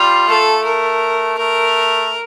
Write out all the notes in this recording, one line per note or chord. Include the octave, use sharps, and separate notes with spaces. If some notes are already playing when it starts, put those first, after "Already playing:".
Already playing: G3 F4
A3 A4
A#4
A3 A#4